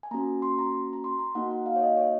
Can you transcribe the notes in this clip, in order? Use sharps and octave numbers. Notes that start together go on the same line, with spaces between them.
G#5
A#3 C#4 F#4 A#5
C6
A#5
A#5
C6
A#5
A#3 D#4 F#4 F#5
F#5
F5
C#5
D#5
C#5